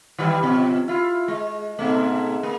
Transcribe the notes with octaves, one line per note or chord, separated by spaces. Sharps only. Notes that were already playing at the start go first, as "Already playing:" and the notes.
D#3 E3 G3
B2 F3
E4 F4
G#3
G#2 B2 A3
A#3